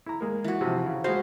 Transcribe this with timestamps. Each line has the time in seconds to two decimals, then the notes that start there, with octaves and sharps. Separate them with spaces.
0.06 E4 A#5
0.21 G#3 A#3
0.44 E3 F#4
0.61 C3 F3
0.86 C#3
1.04 G#3 F#4 G#4 B4 C5 F5